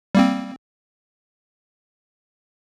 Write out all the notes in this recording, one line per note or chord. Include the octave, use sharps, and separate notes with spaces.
G3 A#3 C4